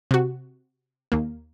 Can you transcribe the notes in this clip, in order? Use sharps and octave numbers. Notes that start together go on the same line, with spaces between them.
C3 F#4
D#2 A#3